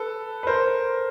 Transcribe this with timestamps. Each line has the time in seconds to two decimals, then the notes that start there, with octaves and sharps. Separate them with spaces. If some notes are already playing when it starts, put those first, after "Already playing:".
Already playing: A4 B4
0.43 B4
0.47 A#4 C5